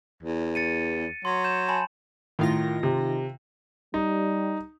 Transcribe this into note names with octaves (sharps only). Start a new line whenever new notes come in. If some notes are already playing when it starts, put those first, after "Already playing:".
E2
A6 C#7 D#7
F#3 C6
G6 E7
G#5 A5 B5
A2 D#3 F4 A#6
C3
G3 D#4